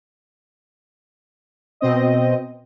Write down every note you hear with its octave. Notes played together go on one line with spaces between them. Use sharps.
B2 C4 D#5